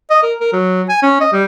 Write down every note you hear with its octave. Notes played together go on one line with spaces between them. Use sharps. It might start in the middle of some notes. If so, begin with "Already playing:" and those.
D#5
A#4
A#4
F#3
G#5
C#4
D#5
G3